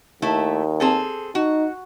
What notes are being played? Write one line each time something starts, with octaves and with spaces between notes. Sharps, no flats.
D#2 A3 E4
C4 G#4 A4
D#4 F#4